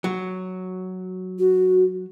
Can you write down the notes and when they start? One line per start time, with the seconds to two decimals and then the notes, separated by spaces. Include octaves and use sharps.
0.04 F#3
1.39 F#4